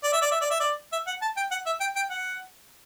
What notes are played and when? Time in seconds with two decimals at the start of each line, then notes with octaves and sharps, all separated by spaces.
0.03 D5
0.13 E5
0.22 D5
0.31 E5
0.41 D5
0.51 E5
0.60 D5
0.92 E5
1.07 F#5
1.22 A5
1.37 G5
1.51 F#5
1.66 E5
1.80 G5
1.96 G5
2.10 F#5